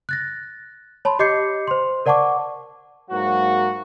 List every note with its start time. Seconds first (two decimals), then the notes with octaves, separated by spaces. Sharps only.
0.09 F#6 A6 A#6
1.05 C#5 A5 B5 C6
1.19 G4 D#5 D6 G6 C7 C#7
1.68 C5 C6
2.06 A#4 D5 F#5 A5 C#6 D6
3.11 G#2 F#3 A#3 F#4